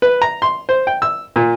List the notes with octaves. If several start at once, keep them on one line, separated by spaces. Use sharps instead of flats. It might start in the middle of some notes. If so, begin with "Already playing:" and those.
B4
A#5
C6
C5
G5
E6
A#2